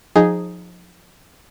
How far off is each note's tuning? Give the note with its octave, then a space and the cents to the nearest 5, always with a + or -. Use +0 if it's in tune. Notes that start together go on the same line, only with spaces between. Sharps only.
F3 +25 D#4 +0 G#4 +0